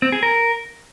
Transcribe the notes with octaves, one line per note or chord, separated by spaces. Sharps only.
C4
G#4
A#4